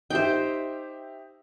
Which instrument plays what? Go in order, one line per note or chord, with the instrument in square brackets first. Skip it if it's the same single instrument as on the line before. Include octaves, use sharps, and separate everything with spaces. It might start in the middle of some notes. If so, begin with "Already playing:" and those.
[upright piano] D#4 G4 E5 [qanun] C5 G5